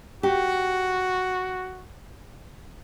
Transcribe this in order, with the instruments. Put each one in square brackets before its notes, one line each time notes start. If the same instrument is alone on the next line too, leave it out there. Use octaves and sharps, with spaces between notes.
[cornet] F#4 [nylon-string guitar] G4